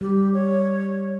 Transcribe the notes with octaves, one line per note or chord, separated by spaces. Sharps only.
G3 G4
C#5